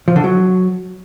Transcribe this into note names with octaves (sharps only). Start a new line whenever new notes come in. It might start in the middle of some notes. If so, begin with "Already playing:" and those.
F3
D3
F#3